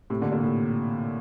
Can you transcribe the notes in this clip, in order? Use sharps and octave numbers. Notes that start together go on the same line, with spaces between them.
A2 C3
A#2 D3
A#2 D3
A2 C3